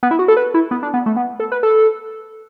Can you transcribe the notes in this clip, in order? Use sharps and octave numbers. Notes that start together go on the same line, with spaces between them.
B3
E4
F#4
A4
B4
E4
B3
D4
B3
A3
B3
A4
B4
A4